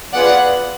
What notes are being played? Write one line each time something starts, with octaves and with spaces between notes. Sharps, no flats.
B3 F4 G#4 D5 F#5